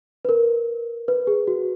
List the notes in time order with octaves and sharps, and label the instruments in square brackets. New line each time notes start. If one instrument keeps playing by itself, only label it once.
[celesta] B4
A#4
B4
G#4
F#4